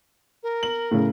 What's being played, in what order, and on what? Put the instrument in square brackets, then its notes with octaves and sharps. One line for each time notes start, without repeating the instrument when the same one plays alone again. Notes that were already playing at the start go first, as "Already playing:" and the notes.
[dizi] A#4
[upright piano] F#7
A2 C#3